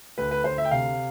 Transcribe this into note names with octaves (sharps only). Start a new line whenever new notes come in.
D2 B4
B4
D2 C5
E5
G5
C3 F5